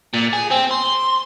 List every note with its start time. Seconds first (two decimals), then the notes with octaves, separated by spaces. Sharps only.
0.14 A#2
0.33 G#4
0.51 C4
0.71 C6